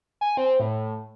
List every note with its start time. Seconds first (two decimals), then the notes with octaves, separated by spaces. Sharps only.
0.21 G#5
0.37 C4
0.60 A2